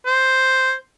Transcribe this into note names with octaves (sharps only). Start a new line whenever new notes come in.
C5